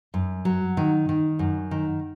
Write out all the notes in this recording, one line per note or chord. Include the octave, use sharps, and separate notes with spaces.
F#2
F#3
D#3
D#3
F#2
D#3